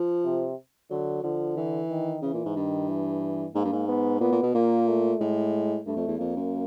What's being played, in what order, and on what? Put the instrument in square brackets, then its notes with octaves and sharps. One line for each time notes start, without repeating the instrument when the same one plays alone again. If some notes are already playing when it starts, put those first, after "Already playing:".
Already playing: [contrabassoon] F3
[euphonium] C3
[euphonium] D3 [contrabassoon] F#3
[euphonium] D3 [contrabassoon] F3
[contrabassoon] E3
[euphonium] D#3
[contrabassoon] C#3 [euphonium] E3
[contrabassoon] A#2
G#2
[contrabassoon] G2 [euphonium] D#3
[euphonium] E3
[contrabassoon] G#2 [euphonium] A#3
[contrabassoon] G2
G#2
[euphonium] B3
[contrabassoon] A#2 [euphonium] B3
[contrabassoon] A#2
B2
[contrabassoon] A#2 [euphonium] A#3
[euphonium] A3
[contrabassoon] A2 [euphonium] G#3
[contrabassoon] G2 [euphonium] A3
[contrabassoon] F2
E2
[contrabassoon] F2 [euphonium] A#3
[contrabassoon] F#2